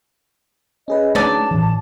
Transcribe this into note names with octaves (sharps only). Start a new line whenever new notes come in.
C#4 G#4 B4 D#5
F#3 A3 D4 D#4 D5 A5
A2 E3